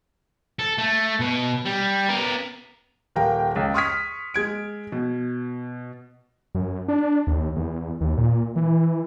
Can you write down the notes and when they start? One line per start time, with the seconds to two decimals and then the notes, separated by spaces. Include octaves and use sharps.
0.59 A4
0.78 A3
1.20 B2
1.65 G3
2.08 B3 A#4
3.16 D#1 A#4 F5 G5
3.56 C#2
3.74 C6 C#6 D#6 F6 G#6 B6
4.34 G#3 G#6 D7
4.92 B2
6.55 F#2
6.88 D4
7.27 D#2
7.56 E2
8.01 D#2
8.18 A#2
8.56 E3